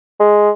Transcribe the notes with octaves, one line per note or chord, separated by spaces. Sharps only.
G#3